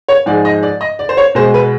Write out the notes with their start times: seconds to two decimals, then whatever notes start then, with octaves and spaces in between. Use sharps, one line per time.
0.08 C#5
0.26 G#2 F3 G#3 D5
0.45 D#5
0.63 D5
0.81 D#5
0.99 D5
1.09 C5
1.17 C#5
1.35 B2 G#3 C5
1.54 B4